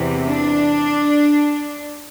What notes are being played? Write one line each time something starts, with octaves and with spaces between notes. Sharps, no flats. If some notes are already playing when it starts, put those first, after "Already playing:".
Already playing: E2 C3 E3
D4